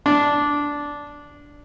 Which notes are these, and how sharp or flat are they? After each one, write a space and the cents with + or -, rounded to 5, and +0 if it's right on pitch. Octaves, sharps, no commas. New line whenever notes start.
D4 -10